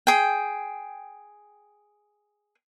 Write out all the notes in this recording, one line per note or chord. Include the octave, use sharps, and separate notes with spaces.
G#4 G5